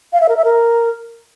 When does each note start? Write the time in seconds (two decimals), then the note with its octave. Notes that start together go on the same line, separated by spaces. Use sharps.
0.13 F5
0.21 E5
0.29 A#4
0.37 E5
0.45 A#4